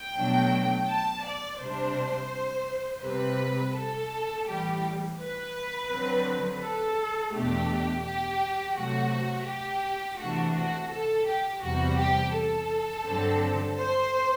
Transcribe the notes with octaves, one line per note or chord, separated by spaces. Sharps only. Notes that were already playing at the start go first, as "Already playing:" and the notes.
Already playing: G5
B2 F#3 A3 D4
A5
D5
C3 G3 D4 C5
C3 G3 C4 B4
A4
A2 E3 G3 G4
B4
D3 F#3 C4
A4
E2 B2 A3 D4 G4
G4
C3 F#3 A3 F#4
G4
C3 E3 A3 D4 F#4
F#4
A4
G4
E2 C3 G3 F#4
G4
A4
G2 D3 F#3 C4
C5